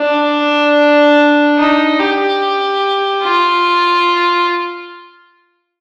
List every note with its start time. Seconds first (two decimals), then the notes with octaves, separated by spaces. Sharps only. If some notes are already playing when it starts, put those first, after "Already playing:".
Already playing: D4
1.58 D#4
1.99 G4
3.22 F4